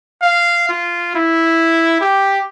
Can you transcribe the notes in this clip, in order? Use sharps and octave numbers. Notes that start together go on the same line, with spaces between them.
F5
F4
E4
G4